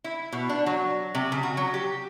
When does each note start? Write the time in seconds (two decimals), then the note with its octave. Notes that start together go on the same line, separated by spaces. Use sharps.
0.04 E4
0.32 B2
0.49 D4
0.66 F#3
1.15 C3
1.32 C#3
1.43 F#4
1.57 F#3
1.74 G4